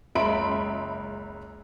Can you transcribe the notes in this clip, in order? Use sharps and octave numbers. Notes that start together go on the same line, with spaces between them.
F#1 C#2 E5 B5 C6 D7